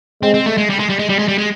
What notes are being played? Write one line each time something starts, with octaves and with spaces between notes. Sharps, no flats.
G#3 C4
C4
A3
G#3
G3
G#3
G3
G#3
G3
G#3
G3
G#3